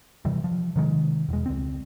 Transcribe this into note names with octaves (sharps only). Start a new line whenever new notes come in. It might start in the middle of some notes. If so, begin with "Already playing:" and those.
C3 E3 G3
F3
C3 D#3 G#3
E1 G#3
C#2 C4